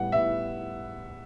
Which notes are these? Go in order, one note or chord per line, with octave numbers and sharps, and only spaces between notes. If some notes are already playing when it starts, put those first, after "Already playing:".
Already playing: A2 G3 B3 F#5
A2 G3 B3 E5